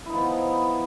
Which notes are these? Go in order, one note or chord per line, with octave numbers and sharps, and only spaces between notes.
F3 B3 D#4 E4